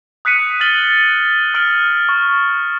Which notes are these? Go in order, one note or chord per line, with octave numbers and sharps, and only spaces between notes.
D#6 F#6 B6 C#7 D#7
F6 A6 F#7 G7
D#6 F6 D7 F#7
C#6